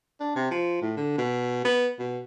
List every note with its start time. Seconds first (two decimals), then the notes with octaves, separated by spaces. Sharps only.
0.20 D4
0.35 C3
0.51 F3
0.82 A2
0.97 D3
1.18 B2
1.65 B3
1.99 B2